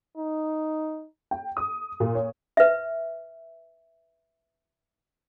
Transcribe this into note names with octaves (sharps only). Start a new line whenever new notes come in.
D#4
G5
D#6
A#2
C#5
B4 E5